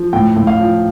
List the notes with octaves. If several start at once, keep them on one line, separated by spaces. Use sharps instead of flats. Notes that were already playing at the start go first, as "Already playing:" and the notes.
Already playing: F3
A2 G5
A2
F5
F3